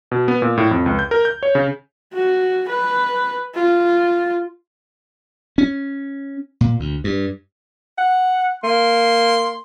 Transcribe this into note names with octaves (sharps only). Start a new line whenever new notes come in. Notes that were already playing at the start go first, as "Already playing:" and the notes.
B2
B3
A#2
A2
F2
C#2
G6
A#4
G6
C#5
C#3
F#4
B4
F4
C#4
A#2
D2
G2
F#5
A#3 C6